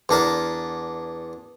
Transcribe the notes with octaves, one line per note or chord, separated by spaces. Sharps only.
E2 D4 A#4 A5